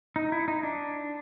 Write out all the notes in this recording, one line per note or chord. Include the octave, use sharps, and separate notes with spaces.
D#4
E4
D#4
D4